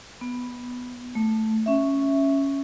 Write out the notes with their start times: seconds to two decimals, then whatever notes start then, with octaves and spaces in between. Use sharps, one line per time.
0.21 B3
1.15 A3
1.66 C#4 E5